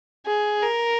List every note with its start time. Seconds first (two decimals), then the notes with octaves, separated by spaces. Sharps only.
0.26 G#4
0.62 A#4